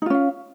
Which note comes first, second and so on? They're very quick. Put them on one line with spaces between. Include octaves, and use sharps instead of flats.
D#4 F4 C#4 F5